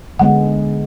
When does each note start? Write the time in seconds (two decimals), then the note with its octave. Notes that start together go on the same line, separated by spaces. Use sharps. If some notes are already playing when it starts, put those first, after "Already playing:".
0.19 D3 G#3 B3 F#5